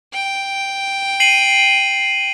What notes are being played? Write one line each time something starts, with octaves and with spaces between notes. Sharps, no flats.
G5
C7 D#7 F#7